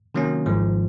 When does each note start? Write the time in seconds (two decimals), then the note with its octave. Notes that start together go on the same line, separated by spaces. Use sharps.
0.15 C3 D#3 F#3 A#3 C#4
0.46 G#1 G#2 F3